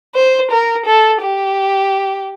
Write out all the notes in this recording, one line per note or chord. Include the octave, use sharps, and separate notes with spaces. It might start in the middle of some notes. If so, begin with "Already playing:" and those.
C5
A#4
A4
G4